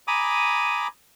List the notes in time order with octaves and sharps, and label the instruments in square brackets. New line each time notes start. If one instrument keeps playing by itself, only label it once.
[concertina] G#5 A#5 B5 D6 D#6